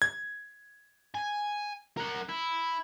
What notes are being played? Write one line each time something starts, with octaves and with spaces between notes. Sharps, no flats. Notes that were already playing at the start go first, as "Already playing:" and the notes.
G#6
G#5
A#4 F#5
E4